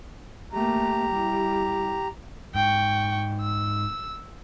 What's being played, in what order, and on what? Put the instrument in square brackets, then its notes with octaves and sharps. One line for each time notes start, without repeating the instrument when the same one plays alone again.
[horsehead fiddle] A3 A#3 [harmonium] G4 A#5
[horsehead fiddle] G3 E4
[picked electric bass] G#2 [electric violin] G5 C#6
[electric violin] E6